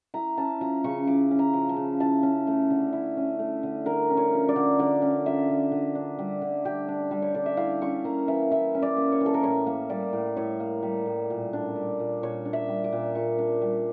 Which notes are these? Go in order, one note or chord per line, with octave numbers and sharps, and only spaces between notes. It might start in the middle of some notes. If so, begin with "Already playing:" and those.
E4 A#5
C#4 A5
F3 A#5
C#3 C#6
E4 D6
C#4
A#5
F3
A5
C#3
E4 A5
C#4
A3
D3
E4
C#4
A3
D3
D3 A#4
C#4
C#5
F3
D5
D3
D3 D5
C#4
F3 E5
D3
D3
D4
G3
D3
D3 G4
D4
G3
C#5
D3 D5
E5
E4 F5
C#4 C#6
A#3 A#5
E3 E5
E4 E5
C#4
D5
A#3
C#5
E3
A4
A#4
A2 C#5
A#3
G3 D5
A2
A2 C#5
A#3
G3
A2
A#2
D4
G3
A#2
A#2 C#5
D4
E5
G3
D6
A#2
A#2 C#6
D4
G3